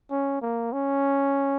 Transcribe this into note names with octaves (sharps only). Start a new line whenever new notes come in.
C#4
A#3
C#4